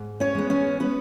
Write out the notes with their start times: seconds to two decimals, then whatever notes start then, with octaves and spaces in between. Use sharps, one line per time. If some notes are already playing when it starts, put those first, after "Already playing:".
Already playing: G#2
0.20 C#4 C#5
0.35 G#3 B3
0.50 C#4 C#5
0.80 B3 B4